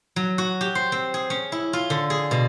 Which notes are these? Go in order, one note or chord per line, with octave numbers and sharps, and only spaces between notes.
F#3
F#4
G4
C5
C4
G#4
C#4
E4
F4
D3
G#4
B2